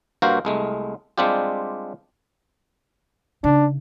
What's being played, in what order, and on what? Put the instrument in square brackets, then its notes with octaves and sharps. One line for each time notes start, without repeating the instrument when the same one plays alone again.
[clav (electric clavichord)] G2 A#3 F#4 C5 F5 A#5
C2 G#3 A3
G3 G#3 C4 D4 F4 G4
[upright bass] C#3 D#4 [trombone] D4